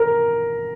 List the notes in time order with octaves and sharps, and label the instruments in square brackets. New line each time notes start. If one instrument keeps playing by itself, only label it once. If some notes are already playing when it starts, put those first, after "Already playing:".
Already playing: [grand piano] A#4